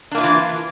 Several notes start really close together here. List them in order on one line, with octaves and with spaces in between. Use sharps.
D4 A#3 E4 F4 E3